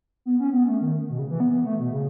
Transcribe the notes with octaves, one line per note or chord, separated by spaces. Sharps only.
B3
C#4
B3
A3
D#3
B2
C#3
E3
B3
B3
A3
B2
C#3